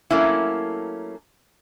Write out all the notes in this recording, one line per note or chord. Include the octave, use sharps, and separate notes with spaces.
F#3 A3 A#3 C#4 E4